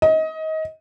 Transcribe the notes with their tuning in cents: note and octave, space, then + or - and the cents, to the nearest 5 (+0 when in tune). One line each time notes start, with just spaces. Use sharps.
D#5 +25